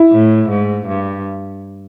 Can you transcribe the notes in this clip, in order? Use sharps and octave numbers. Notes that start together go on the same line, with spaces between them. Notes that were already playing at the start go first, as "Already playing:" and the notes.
Already playing: E4
A2
G#2
G2